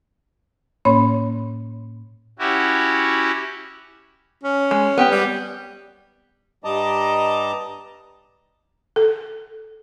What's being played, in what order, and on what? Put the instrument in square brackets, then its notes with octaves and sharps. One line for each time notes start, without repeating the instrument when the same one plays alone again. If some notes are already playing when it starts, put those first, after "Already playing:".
[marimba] A2 A#3 C#4 C#5 B5 C6
[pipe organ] C#4 E4 F#4 G4
[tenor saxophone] C#4
[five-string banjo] G#3
B3 G4 G5
[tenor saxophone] G3
[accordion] G2 G3 D#5 A5 A#5 D6
[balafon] A4